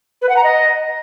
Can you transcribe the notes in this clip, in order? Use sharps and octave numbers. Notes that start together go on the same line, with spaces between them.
B4
F#5
A#5
D#5